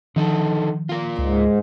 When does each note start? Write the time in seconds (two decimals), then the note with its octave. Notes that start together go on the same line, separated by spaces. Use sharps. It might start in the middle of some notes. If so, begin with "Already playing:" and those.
0.16 D3 D#3 F3 D#4 A4
0.89 F4 A#4
1.18 C#2 G#2